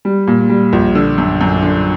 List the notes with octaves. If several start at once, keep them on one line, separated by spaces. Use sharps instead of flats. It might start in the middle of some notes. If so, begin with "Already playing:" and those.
G3
A#2
G3
A#1
D3
F#2
F#2
D3